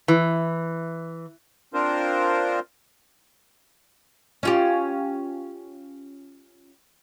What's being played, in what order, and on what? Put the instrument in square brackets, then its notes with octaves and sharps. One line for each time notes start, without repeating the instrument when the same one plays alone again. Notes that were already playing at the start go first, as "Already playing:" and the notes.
[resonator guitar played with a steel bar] E3
[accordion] C4 D4 F4 A#4 C5
[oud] C#4 F4 G4